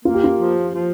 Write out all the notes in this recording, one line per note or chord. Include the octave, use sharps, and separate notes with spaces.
A#3 F4
G4
F4
F3
F3